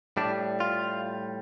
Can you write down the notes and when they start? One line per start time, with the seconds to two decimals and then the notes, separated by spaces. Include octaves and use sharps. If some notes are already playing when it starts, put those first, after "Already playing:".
0.17 A2 G3 D4
0.60 F4